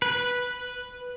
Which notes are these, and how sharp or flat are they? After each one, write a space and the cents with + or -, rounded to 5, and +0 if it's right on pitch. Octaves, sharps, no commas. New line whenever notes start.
B4 -5